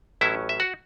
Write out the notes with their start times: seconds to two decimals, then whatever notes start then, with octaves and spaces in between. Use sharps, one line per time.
0.21 A1 A2 F#3 C#4 E4 E5
0.49 E5
0.60 F#4 F#5